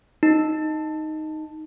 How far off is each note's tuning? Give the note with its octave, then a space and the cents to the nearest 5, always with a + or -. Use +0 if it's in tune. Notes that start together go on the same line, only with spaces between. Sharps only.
D#4 +0